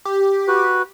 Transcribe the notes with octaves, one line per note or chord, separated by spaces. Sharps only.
G4
F#4 B4